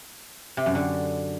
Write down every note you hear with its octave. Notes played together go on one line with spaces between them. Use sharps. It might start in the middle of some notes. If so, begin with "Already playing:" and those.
C3
F#2
D3